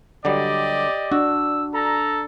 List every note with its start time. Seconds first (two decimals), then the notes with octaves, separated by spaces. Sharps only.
0.25 D3 F#3 G3 G4 D5 D#5
1.12 D4 F#4 E6
1.74 A4 A#5